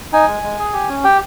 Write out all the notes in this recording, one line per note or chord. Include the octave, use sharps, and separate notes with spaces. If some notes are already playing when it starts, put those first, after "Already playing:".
D#4 G#5
G#3
G#3
G#4
G4
C#4
G4 G5